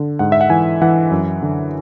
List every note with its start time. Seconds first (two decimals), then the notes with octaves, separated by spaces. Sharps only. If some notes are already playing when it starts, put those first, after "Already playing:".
Already playing: D3
0.19 G#2 F#5
0.32 E5
0.41 F#5
0.50 E3 G#5
0.82 E3 F#5
1.11 F#2
1.43 D3